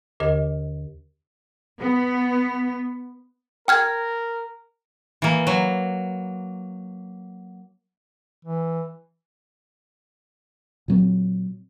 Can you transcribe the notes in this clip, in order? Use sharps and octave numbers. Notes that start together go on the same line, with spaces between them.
D#2 D3 G4 A#4 D#5
B3
A#4 G5 F6 G#6
E3 A#3
F#3
E3
A#2 F#3 C4